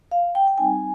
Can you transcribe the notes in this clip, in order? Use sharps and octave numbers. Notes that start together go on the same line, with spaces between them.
F5
G5
G5
G3 C4 D#4 G#5